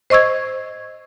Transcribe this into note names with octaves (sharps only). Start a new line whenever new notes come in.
C5 D#5 C#6 E6 G#6